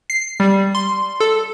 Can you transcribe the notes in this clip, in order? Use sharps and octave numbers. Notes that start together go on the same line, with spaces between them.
C7
G3
C6
A4